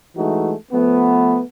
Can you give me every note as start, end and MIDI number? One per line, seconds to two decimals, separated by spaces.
0.16 0.53 52
0.16 0.53 56
0.16 0.53 57
0.16 0.53 63
0.16 0.53 66
0.72 1.40 53
0.72 1.40 57
0.72 1.40 59